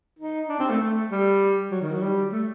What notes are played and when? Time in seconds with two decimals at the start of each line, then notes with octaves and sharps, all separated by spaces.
0.19 D#4
0.49 D4
0.59 C4
0.70 A3
0.80 A3
1.10 G3
1.71 F#3
1.82 D#3
1.92 F#3
2.01 G3
2.32 A3